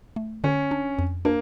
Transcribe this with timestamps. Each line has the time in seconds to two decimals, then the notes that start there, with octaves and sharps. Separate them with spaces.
0.16 A3
0.44 D3 C#4
0.71 D4
0.99 F2
1.25 A#3 D4